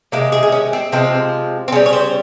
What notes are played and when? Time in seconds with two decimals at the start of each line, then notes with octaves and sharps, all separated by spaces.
0.12 C3 D#3 G#3 A#3
0.32 G#4
0.43 G#4
0.52 C#4
0.73 C4
0.92 C3 F3 G#3 C4
1.68 C4
1.72 C#3 G3 C#4
1.86 C#5
1.93 C5